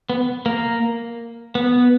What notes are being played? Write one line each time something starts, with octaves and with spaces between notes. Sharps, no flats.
B3
A#3
B3